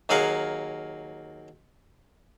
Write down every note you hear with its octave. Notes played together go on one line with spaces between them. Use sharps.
D#2 F#3 G#4 A#4 F5 F#5